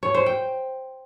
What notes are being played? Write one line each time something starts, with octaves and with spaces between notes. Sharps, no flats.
C#5
C5
G5